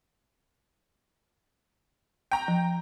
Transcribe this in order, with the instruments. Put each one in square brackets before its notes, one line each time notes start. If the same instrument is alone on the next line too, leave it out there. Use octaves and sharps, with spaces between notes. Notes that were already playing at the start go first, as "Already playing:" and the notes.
[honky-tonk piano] G5 A#5
[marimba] F3